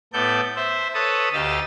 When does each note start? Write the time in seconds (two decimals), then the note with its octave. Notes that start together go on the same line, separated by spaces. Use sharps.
0.13 A2 B3 A4 D5 G6
0.56 C5 E5
0.94 A4 B4 C#5 A5 B5 D#6
1.33 D2 G4 D#5 F5 E6 A6